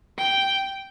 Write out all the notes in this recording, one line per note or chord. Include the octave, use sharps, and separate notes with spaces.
G5